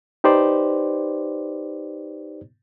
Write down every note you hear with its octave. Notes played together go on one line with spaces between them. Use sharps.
D#4 G4 B4 C5 D5